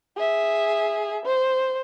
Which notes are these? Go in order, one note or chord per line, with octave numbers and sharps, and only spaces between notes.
G#4 E5
C5